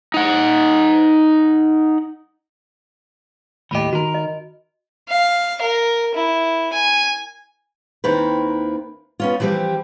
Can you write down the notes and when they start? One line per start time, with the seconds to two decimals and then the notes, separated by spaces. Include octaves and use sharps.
0.14 D#4 F#5
3.71 D#2 A2 G4 D#5 B5
3.93 D#3 F#4 A#4
4.15 D#5
5.09 F5
5.62 A#4
6.15 E4
6.73 G#5
8.04 D#2 D#3 C4 E4 B4
9.20 B3 C#4 F4
9.40 E3 F3 G3 C4 G4